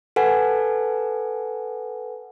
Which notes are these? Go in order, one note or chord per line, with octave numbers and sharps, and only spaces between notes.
A4 B4 F#5 G#5